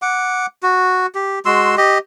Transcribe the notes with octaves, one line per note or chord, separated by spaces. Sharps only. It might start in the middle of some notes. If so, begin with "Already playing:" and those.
F#5 D6
F#4
G4
G#3 F#4 C6 E6
G4 D#5